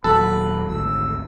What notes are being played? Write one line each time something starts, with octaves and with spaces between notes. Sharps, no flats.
D#1 F#3 A4 B4 B5
G#1 D2 E6